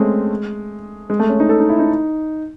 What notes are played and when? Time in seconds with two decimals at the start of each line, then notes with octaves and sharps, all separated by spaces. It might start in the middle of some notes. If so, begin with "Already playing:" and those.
Already playing: G#3 A3 C4 C#4
1.10 G#3
1.19 A3
1.29 C#4
1.40 D#4
1.49 A4
1.60 D#4
1.69 E4
1.79 D#4